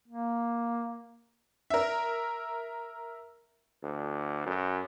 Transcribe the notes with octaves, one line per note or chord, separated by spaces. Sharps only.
A#3
A#4 E5
D2
F#2